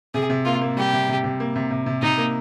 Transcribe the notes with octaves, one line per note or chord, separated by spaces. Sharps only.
C3 G#4
C3
A#3 F4
A#3
G3 G4
C3
C3
C3
A#3
C3
C3
C3
C3 D#4
A#3